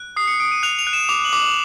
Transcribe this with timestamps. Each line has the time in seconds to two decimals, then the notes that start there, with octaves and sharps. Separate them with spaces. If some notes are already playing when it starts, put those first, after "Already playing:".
Already playing: F#6
0.16 D#6 C7
0.27 C#7
0.40 D#6 D7
0.52 D#7
0.63 F#6 F7
0.79 F7
0.87 F#6
0.93 E7
1.09 D6 F7
1.25 F#7
1.33 D6
1.40 F#7